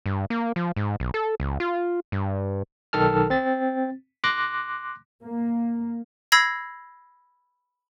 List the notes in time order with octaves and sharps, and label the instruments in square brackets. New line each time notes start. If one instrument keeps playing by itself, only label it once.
[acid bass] G2
A#3
F3
G#2
B1
A4
C#2
F4
G2
[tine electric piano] B1 D#3 A4 A5 F6
C4 A6
C6 D6 F#6 A#6
[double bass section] A#3
[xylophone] B5 E6 G#6 A#6 C7